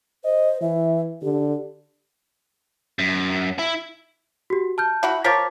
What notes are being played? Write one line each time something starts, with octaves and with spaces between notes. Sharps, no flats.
C5 D#5
E3 E5
D3 G4
F#2
E4
F#4 G4
A5 F6 G6
E4 F#4 B5
F3 A#4 C#5 D6 A6 B6